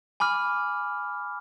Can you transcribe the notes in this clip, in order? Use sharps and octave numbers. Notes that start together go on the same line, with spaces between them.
G#5 B5 D6 F6